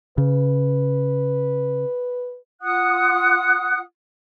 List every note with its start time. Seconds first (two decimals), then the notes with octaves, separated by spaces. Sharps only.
0.18 C#3 B4
2.61 F4 F#5 D#6 F#6